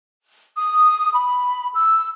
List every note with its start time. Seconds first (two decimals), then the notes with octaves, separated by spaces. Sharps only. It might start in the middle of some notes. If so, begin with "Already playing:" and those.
0.58 D#6
1.13 B5
1.74 E6